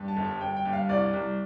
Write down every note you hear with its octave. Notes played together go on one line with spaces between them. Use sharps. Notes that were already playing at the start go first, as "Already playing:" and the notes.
Already playing: G2
A5
G1
A5
G1 G5
G5
G2
F5
C2 D5
C2